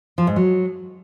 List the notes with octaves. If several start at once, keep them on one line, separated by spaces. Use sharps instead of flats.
F3
G#2
F#3